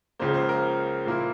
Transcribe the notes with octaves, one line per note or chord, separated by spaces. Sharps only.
C#2 C#3 F3 A#3 C5
C5
A#4
A#2 F3 A#3 E4